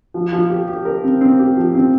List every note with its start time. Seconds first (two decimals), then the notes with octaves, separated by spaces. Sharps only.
0.14 F3
0.32 F3
0.50 G4
0.68 G4
0.85 A#4
1.04 C4
1.21 C4
1.39 G4
1.57 F3
1.74 C4